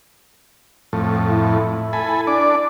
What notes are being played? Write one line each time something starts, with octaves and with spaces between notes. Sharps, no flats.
F2 A2
E4
A4 G#5 B5
D4 D5